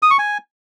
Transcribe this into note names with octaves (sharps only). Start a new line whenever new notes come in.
D#6
C#6
G#5